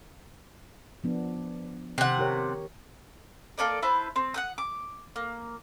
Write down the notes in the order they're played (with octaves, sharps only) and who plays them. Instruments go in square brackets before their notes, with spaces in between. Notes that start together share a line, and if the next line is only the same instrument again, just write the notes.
[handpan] F3 B3 D4
[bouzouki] C3 F#5 [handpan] D#3
[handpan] G4 A#4 C#5
[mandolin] A#3 A4 D5 D#5
E4 B4 C5 A5
C4
F#5 G5 D#6
D6
A#3